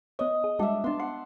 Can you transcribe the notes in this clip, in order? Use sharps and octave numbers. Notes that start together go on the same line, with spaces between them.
B3 C#5 D#5
G#4
G3 G#3 D4 F#4 E5
B3 D4 A5 C6
F#5 C6